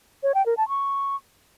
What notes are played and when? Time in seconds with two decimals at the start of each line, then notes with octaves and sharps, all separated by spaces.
0.23 C#5
0.35 G5
0.46 A#4
0.57 A5
0.69 C#6